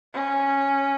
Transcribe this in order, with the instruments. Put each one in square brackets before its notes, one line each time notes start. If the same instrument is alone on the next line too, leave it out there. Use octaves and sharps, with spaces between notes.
[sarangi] C#4